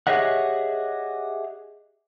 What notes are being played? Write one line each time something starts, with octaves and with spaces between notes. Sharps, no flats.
G4 G#4 C#5 D#5 E5 F#5